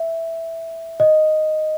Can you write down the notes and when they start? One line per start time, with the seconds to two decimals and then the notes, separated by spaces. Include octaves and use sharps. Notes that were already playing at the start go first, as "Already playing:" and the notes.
Already playing: E5
1.00 D#5